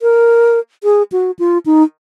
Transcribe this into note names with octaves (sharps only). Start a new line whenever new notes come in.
A#4
G#4
F#4
F4
D#4